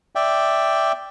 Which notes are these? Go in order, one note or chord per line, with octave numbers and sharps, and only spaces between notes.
D5 E5 G5